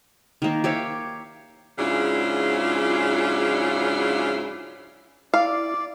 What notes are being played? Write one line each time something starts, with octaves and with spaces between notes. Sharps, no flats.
D#3 A#3
G4 C#5 E5 F5
G#2 C#3 F#3 D4 E4 F4
E4 D5 F5